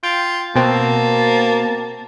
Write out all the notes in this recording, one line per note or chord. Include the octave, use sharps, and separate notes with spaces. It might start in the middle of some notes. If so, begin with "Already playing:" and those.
F4 G5
B2 A#3 C4 A5